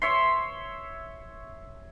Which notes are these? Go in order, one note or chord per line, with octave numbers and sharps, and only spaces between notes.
C#5 E5 C6